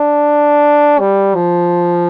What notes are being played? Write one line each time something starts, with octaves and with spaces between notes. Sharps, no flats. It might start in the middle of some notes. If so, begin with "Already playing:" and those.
Already playing: D4
G3
F3